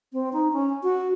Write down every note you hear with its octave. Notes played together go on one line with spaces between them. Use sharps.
C4
D#4
C#4
F#4